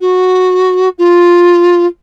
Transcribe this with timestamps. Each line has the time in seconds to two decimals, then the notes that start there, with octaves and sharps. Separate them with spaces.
0.01 F#4
0.98 F4